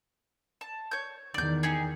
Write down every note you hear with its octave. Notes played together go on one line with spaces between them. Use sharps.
A5
C#5 G6
E2 D#3 D5 G6
D#4 G4 G#4